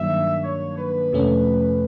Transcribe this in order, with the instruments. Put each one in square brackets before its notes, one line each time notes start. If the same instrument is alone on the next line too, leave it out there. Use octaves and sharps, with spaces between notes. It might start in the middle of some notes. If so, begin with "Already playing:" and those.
Already playing: [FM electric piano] G2 D#3 F#3 A#3 D4 [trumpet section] E5
[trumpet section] C#5
B4
[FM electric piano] F2 C3 F3 A3 C#4